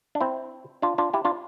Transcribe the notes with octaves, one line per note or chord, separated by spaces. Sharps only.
D4
C4 E4
D4 F4
D4 F4
E4 G4
D4 F4